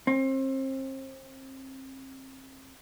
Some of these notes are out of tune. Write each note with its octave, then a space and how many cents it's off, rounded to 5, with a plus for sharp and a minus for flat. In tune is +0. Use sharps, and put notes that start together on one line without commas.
C4 +35